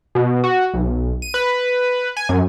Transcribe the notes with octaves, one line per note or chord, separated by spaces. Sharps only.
B2
F#4
B1
D#7
B4
G#5
F#2